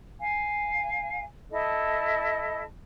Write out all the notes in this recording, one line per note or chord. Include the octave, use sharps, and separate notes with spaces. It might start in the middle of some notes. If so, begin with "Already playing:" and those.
F5 G#5
E4 A4 D#5 A5